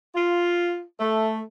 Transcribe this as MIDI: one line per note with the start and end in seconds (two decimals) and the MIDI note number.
0.14 0.81 65
0.99 1.40 57